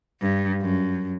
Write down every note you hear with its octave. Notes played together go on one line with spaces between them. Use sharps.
G2
F#2